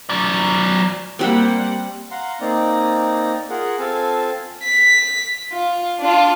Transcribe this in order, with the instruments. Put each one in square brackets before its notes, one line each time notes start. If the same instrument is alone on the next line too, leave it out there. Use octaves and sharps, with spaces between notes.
[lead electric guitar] F#3 D5
[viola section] G3 A#3 F#5 [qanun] C4 G4 C5
[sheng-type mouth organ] F5 F#5 A#5 C6
A#3 C4 D#4 D5 A#5
F4 G#4 A#4 F#5
C4 F4 A4 F5 G#5 A5
[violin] B6
F4
D4 F4